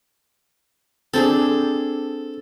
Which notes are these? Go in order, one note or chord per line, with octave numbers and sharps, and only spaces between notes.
C4 D4 G#4 A4